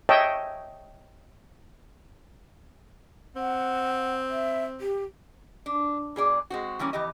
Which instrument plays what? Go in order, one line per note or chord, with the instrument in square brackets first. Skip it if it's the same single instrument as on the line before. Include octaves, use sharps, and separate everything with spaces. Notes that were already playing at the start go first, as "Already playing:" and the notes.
[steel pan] C#5 D#5 E5 G5 A5
[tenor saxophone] C4 [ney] F#5
[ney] E5
G4
[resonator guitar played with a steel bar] D4
B2 G#4 D5
G#3 C4 F#4
E3 G3 A#3 C#4
F2 E3 G4 D#5